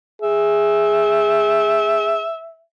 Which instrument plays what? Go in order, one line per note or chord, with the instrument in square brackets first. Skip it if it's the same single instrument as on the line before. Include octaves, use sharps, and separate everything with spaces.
[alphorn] G#4 [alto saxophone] E5